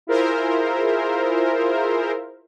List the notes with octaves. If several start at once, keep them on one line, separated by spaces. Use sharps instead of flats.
E4 F4 G#4 A#4 C5 E5